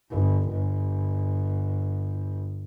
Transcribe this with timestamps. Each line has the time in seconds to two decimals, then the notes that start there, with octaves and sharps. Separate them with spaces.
0.11 G1
0.49 G1